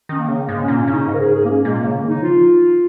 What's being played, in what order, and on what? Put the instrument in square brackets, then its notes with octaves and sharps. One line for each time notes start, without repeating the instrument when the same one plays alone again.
[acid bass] D#3 [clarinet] C#4
[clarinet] A#3
[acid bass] C#3
[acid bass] G#2 [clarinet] A#3
[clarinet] C#4
[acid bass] A#2
[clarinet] C#4
[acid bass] C#3 [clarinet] D#4
[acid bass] G#2
[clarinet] A#4
G#4
G#4
A#3
C#4
[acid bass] A#2 [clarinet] G#3
[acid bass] C#3 [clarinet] A#3
[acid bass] D#3 [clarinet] D#4
[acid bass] F3 [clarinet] F4